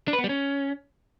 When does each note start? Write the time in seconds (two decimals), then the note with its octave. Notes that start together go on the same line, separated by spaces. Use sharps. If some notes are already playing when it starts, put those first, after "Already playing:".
0.08 D4
0.13 B4
0.19 B3
0.24 G3
0.29 C#4